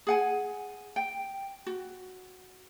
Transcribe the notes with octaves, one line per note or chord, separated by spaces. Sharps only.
G#4 F#5 G#5
G5
F#4